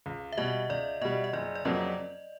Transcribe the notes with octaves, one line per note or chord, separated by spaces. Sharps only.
C#2
E5
B2 G3 D#5
C#2 D5
B2 G3 D#5
D#5
F#1 D5
D5
F2 C#3 F#3 A#3 D#5